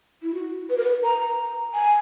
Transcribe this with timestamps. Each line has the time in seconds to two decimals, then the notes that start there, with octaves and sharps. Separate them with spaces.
0.22 E4
0.34 F#4
0.69 B4
0.77 A#4
0.84 B4
1.04 A#5
1.74 G#5